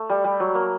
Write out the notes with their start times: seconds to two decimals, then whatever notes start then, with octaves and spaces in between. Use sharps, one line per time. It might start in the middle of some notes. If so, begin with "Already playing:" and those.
Already playing: A3
0.10 G3
0.24 G3
0.40 F#3
0.55 A#3